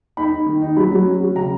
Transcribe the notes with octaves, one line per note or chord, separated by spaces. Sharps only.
D#4 B5
D#4
D#3
D#4
F#3 B5
F#3
C#4
F#3
C#3 A#5